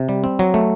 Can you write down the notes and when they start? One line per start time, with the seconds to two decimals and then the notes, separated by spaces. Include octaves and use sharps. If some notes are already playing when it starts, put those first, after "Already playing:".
Already playing: C3
0.09 G3
0.24 C4
0.39 F#3
0.54 A3